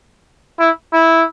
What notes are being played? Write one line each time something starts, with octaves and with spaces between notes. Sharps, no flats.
E4
E4